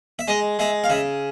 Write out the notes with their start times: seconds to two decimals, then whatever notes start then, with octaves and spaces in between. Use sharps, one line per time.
0.19 E5
0.28 G#3 D#5
0.59 G#3 E5
0.84 F5
0.90 C#3 E5